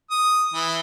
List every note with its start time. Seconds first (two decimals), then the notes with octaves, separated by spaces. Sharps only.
0.11 D#6
0.54 E3